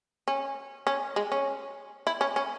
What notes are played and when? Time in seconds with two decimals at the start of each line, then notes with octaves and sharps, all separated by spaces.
0.28 C#4
0.87 C#4
1.16 G#3
1.32 C#4
2.07 E4
2.21 C#4
2.36 C#4